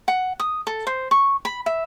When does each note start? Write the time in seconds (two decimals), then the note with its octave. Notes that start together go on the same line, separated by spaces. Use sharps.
0.08 F#5
0.40 D#6
0.67 A4
0.87 C5
1.11 C#6
1.45 B5
1.66 E5